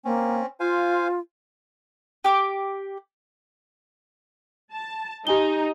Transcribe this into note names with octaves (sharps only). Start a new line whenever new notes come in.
A#3 C4 C#4
F4 C5 F5 G#5
G4 D6
A5
D#4 G4 G#5 G7